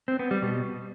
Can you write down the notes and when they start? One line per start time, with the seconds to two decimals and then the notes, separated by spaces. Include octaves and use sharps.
0.08 C4
0.19 B3
0.31 G3
0.42 B2